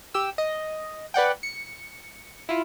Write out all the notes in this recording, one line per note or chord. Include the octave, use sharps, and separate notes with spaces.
G4 E6
D#5
B4 D5 F#5 G5
C#7
E4 F4